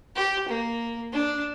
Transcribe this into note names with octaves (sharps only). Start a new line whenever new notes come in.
G4
A#3
D4